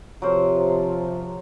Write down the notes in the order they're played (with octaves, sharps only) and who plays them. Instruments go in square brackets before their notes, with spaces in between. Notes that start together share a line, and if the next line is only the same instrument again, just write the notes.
[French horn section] C3 F3 [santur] F#3 A#4 C5